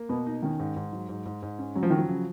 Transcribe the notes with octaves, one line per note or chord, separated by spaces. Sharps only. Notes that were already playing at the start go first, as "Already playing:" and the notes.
Already playing: A#3
B2 B3
D#4
D#3 C#4
G#2
G#2
F#3
G#2
G#2
G#2
C#4
C#3 F#3
F3
D#3 F#3
F3
C#3